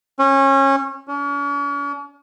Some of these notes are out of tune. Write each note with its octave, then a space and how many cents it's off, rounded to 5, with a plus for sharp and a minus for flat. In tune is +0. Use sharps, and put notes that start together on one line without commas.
C#4 -25
C#4 +40